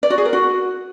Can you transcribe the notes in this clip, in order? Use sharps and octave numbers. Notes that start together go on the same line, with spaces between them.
D5
F#4
G#4
A#4
F#4